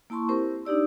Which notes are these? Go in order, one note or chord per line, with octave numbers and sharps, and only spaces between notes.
A#3 E4 A5 C6 C#6
C4 E4 G4 A#4 C5
D4 D#4 G4 D5 E6